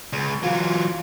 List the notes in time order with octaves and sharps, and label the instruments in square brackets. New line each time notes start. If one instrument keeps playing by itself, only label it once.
[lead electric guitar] C#2
[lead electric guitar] E3 F#3 [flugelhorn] F4